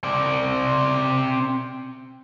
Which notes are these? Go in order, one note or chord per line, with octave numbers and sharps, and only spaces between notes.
C4 D5